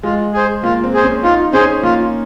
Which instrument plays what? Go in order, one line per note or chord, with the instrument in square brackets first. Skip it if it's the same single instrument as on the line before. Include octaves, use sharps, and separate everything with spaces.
[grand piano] G#3 [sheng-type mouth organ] F4
[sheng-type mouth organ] G#4 C5
[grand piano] A#3 [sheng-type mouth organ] F4
[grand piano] C4
[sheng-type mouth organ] G#4 C5
[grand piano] C#4
[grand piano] D#4 [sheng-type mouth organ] F4
[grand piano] C#4 [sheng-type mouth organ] G#4 C5
[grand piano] A#3 [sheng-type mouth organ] F4